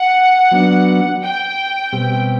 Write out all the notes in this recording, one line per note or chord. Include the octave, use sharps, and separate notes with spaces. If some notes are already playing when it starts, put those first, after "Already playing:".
Already playing: F#5
F#3 B3 D4
G5
B2 G3 C4 G4